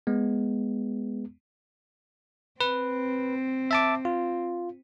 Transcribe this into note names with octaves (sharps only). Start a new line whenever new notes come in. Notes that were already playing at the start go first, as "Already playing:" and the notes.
G#3 B3
C4 B4
E5 A5 D6
F4